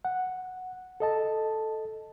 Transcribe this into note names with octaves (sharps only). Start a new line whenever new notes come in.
F#5
A4 D#5 A5